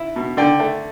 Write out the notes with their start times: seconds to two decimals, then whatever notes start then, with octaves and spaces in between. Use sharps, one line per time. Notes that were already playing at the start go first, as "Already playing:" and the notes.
Already playing: E4
0.16 B2
0.37 D3 D5 G5
0.60 A3